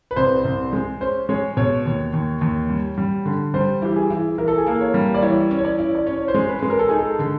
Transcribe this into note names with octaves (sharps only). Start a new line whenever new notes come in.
B4
C2 C5
C2
G#3
C#4 C5
G#3 C#5
B2 C#5
D#2
D#2
D#2
G3
G3
D3
G3 C5
E3 G4
G#4
E3
E3 A#4
A4
G#4
A#3 A4
C#5
G3
D5
E3 C#5
C#4
C#5
D5
E4
D5
C#4 C#5
C#5
C5
G#3
B4
G#3
A#4
A4
D#4 G#4
A4
D3